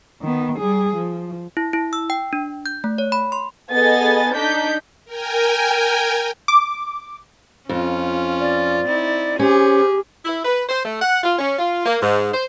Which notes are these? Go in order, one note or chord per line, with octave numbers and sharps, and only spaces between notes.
D#3 B3
G3 G#4
F3
E4
E4
E6
G5
D4
G6
A3
C#5
B5
C6
B3 G#4 A4 D#5 G#5 A6
D4 D#4 D5 G6 B6
A#4 G5 G#5
D6
F2 C#4 F4
D5
C4 D#4 E4
C#4 G4 G#4 C5
E4
B4
C5
A3
F#5
F4
C#4
F4
A#3
G#2
C5